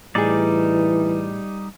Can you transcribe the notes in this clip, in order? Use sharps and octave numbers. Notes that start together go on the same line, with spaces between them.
A2 E3 G3 D#4 G#4 D5